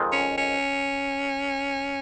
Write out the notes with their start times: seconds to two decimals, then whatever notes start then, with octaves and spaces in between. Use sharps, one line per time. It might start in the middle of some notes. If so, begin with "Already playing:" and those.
Already playing: F2 D#3 G#3 C4 F4
0.12 C#4
0.38 C#4